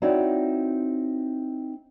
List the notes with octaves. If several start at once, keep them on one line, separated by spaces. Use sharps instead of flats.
C4 D#4 E4 F#4 C#5 D5